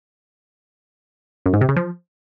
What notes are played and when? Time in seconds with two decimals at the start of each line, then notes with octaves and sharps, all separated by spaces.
1.46 F#2
1.53 G#2
1.61 C3
1.69 C#3
1.77 F3